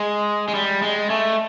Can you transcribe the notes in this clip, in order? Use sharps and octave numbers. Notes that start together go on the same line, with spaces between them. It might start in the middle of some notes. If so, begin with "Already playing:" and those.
Already playing: G#3
G#3
G3
G#3
A3